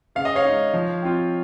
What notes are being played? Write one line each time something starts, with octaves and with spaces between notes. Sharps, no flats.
C#3 F5
D#5
C#5 F5
G#3 D#4
F3
C4 F4